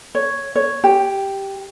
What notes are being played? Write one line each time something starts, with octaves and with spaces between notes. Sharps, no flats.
C#5
C#5
G4